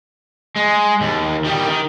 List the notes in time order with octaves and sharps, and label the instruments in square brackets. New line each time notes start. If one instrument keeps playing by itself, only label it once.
[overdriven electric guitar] G#3
D#2
D#3 G3
D#3